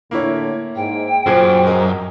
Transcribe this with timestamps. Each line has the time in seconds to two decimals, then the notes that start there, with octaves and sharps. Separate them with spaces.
0.11 A2 D3 A#3 E4 C#5
0.76 G#2 G5
1.26 F#2 A#2 G#4 C5 G#6
1.66 A#4 D#5